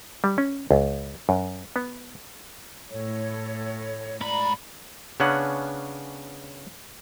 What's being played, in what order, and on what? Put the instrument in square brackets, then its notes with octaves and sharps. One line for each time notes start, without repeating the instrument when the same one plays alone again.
[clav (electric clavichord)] G3
C#4
C#2
F#2
B3
[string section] A2 [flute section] A4 C#5
[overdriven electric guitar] G#2 B5 [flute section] D5 A#5
[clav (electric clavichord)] C#3 B3 C#4 D4 F#5